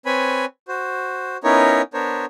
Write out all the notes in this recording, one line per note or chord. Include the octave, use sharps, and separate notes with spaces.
C4 B4 C#5 G#5 B5
F#4 C5
B3 C#4 D#4 E4 A#4 C#5
B3 D4 A#4 C5 C#5